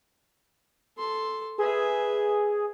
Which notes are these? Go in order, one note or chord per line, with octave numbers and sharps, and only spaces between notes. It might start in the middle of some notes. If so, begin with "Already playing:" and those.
A4 C6
G#4 B4 E5